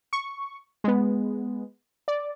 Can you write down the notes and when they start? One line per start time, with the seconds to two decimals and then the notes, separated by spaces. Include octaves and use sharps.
0.13 C#6
0.84 G#3 B3
2.08 D5